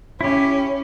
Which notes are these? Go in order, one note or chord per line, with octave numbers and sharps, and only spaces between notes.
C#4 E4 G4